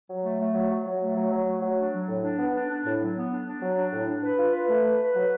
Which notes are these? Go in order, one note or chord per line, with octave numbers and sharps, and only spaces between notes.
F#3
A3
A3
F#3
F#3
F#3
A3
F#3
F#3
A3
F#3
D4
F#3
A2
D4
B3
D4
D4
A2
F#3
B3
D4
D4
F#3
D4
A2
D4
B4
F4
B4
A3
B4
B4
F#3